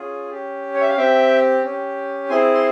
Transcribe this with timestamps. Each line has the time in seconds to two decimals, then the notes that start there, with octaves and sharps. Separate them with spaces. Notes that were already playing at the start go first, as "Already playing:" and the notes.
Already playing: C#4 F4 G#4
0.30 C#4 G4
0.74 C#5
0.81 E5
0.89 F5
0.96 C4 G4 E5 G5
1.63 C#4 G4
2.29 C4 E4 G#4 G#5 C6
2.54 C6